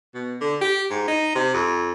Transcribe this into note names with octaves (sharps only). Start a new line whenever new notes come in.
B2
D3
G4
G#2
D#4
C3
F2